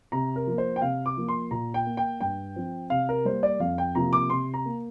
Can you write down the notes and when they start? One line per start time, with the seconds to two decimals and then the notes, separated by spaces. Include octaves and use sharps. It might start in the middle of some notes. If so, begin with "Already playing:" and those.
0.12 C3 A#5
0.36 A#4
0.47 F3 A#3
0.58 C5
0.76 G5
0.82 C3 F5
1.06 D6
1.17 F3 A#3
1.28 C6
1.51 A#2 A#5
1.74 G5
1.86 A#3
1.97 G5
2.21 G2 G5
2.56 F3 C4
2.90 C3 F5
3.09 A#4
3.25 G3 A#3 C5
3.43 D5
3.60 F2 F5
3.78 G5
3.95 C3 F3 A#3 A#5
4.13 D6
4.30 C3 C6
4.54 A#5
4.65 A#3